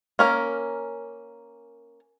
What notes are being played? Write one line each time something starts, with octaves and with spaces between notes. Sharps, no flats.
A#3 C#4 A#4